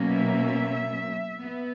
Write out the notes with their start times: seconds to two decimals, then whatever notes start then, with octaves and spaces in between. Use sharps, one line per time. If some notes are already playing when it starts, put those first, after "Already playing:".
Already playing: B2 F#3 A#3 C#4
0.10 E5
1.44 B3